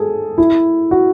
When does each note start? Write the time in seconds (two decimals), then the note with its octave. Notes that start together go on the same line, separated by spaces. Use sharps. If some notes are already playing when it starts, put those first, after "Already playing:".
Already playing: G#4 A4
0.38 E4
0.91 F#4